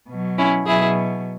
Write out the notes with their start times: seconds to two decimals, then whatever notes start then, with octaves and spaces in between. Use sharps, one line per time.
0.09 B2 F#3
0.38 C#4 E4
0.66 B2 F#3 E4 G#4